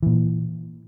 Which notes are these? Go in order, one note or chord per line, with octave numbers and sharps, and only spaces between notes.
A#2 E3